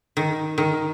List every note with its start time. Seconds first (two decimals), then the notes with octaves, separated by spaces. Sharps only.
0.17 D#3
0.58 D#3